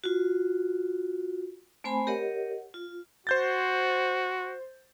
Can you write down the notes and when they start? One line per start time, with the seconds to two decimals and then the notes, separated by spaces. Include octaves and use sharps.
0.04 F4 F#4
1.84 A3 C4 C5 G#5 B5
2.07 G4 A#4 C#5 D#5 F#5
2.74 F4
3.27 F#4 C5 G6 A6